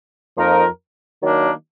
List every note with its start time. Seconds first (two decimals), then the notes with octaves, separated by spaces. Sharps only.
0.36 F2 F3 A#3 D#4 A#4
1.21 D#3 F#3 A#3 D4